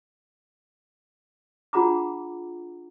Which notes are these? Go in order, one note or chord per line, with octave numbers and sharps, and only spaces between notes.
D4 F4 G#4 F#5 A#5 D6